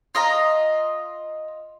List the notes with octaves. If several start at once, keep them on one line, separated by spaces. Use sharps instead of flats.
F4 D#5 F5 A#5